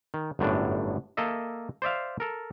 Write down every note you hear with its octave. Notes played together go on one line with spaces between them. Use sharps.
D#3
G1 F#2 A2 D4
A#3 A4 D#5 E5
C5 D5 E5 F5
A4 A#4